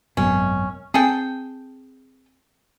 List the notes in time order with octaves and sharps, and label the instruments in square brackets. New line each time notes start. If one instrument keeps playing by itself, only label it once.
[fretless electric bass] G#1 F#2 B2 [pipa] C#4
[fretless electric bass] C4 [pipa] G#4 A4 G5